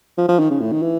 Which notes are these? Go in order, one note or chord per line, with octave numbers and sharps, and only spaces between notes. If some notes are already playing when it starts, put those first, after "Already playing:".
F3
F3
D#3
C#3
A2
D#3
E3